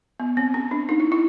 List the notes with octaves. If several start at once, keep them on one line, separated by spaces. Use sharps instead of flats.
B3
C4
C#4
D4
D#4
E4
E4